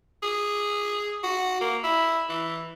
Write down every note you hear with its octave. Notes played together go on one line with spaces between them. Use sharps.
G#4
F#4
A#3
E4
E3